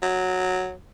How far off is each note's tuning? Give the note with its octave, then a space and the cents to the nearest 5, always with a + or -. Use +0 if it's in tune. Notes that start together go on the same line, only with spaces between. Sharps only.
F#3 -5